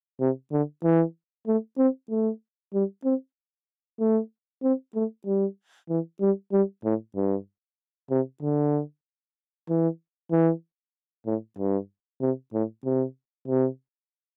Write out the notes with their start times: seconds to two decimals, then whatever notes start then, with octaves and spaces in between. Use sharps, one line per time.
0.20 C3
0.52 D3
0.84 E3
1.47 A3
1.78 C4
2.10 A3
2.74 G3
3.05 C4
4.00 A3
4.63 C4
4.95 A3
5.26 G3
5.89 E3
6.21 G3
6.52 G3
6.84 A2
7.16 G2
8.11 C3
8.42 D3
9.69 E3
10.32 E3
11.26 A2
11.58 G2
12.21 C3
12.53 A2
12.85 C3
13.48 C3